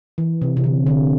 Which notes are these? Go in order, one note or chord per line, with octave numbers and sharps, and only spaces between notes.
E3
C3
C3
D3
D3